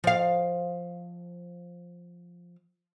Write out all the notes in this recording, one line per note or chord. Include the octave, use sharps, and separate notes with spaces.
F3 F5